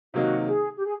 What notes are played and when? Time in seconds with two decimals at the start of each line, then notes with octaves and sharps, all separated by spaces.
0.14 C3 D#3 F#3 A#3 D#4 F#4
0.46 G#4
0.77 G4
0.85 G#4